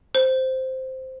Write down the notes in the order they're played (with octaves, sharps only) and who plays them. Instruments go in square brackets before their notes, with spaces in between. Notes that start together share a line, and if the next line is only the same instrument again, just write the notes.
[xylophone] C5